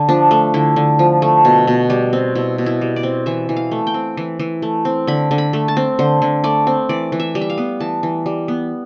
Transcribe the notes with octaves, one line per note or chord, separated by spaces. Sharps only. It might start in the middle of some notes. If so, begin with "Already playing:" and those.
Already playing: D3
F3 D4
A3
D3 E4
D3
F3
A3
B2
B2
G3
C4
B2 E4
B2
E4
G3
D5
C4
E3 E5
E3
F5
A3
G5
C4
E3
E3
A3
C4
D3 B5
D3
B5
A3
A5
C4
D3 C5
D3
A3 D5
C4
E3 D5
E3
E5
G3
E5
F5
B3
E3 A5
E3
G3
B3